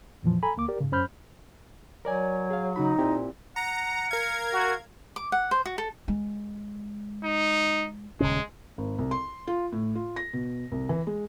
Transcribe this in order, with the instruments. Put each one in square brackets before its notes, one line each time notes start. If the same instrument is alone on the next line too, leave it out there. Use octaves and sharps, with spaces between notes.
[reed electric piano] F2 A#2 E3 F3
A4 G#5 A#5 B5
D2 A#3 D6
G4 A#4 D5
G#2 C#3
F#2 C#4 C5 B5 F6 G6
[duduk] F#3 [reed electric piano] A#4 D5 G#5 [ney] C#5
[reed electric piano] G#4 F5
[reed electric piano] C#3 F#4 B5 [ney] D#4
[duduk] A#2 [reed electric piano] C4 E4 G4
[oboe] F#5 [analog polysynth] A#5 [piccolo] C#7
[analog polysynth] A#4 G#6 [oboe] F5
[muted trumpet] F#4
[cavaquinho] D6
F#5
C5
F#4
A4
[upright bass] G#3
[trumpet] D#4
[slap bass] D#1 C#3 C#4 [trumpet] G#3
[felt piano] G#1
C2
C6
F4
A2
F4
A#6
B2
C2
E3
G#3